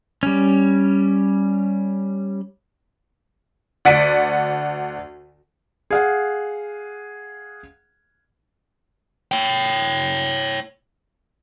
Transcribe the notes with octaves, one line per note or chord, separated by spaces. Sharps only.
G3 C#4
D2 D5 F#5 B6 D7 D#7
G#4 F5 F#5
C#5 G5